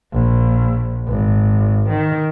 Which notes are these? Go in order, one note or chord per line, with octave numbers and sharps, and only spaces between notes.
A#1
G#1
D#3